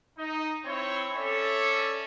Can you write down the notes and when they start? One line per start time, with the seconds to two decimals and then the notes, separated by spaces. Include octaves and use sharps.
0.18 D#4
0.65 C4 E4 C#5
1.13 C#4 A4 C#5 D5 E5